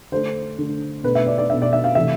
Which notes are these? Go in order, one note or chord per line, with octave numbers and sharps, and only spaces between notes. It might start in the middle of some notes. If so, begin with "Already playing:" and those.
D3 A3 D4 C5
D3 A3 D4
B2 A3 D4 B4
E5
D5
D5
B2 A3 D4 E5
D5
E5
F5
C3 E3 A3 E5